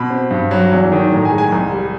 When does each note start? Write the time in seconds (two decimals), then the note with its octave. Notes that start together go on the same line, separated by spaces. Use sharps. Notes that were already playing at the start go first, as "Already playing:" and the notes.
Already playing: B2 B5
0.10 C4
0.30 G2
0.51 F#3
0.71 E2
0.92 D#3
1.11 A2 A#5
1.25 G#5
1.31 G#3
1.38 G#5
1.52 C2
1.72 G3